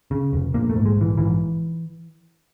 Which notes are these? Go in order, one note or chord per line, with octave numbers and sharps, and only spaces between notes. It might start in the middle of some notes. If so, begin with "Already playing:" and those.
C#3
F1
A#1 A#3
A3
G#2
G#3
A#1 E3
G#2 E3